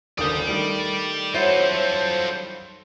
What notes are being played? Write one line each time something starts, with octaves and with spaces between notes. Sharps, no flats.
F#1 D#2 D3 D5 G5 D#6
D#3 G3 A3 D7
F#3 C#4 E4 F4 A4 C5